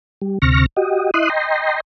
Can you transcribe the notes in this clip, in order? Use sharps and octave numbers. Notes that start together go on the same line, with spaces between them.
G3
D2 C3 C#6 F6 A#6
F#4 G4 D#5
E4 D#5 C6 D#6 F#6
D#5 G5 A#5 C6